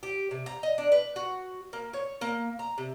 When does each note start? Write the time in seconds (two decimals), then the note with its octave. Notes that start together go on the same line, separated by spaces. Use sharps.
0.03 G4
0.31 C3
0.46 A#5
0.63 D#5
0.78 D4
0.92 B4
1.16 F#4
1.73 A#3
1.93 C#5
2.21 A#3
2.59 A#5
2.78 C3